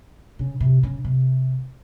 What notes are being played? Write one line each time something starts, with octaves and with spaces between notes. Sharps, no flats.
C#3
C3
C#3
C3